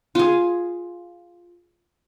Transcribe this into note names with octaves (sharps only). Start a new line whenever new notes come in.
F4 G#4